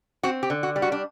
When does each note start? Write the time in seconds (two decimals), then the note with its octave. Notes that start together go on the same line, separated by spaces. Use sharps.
0.23 C4 F#4
0.43 G4
0.50 D3
0.63 F#4
0.76 G3
0.82 F#4
0.92 D4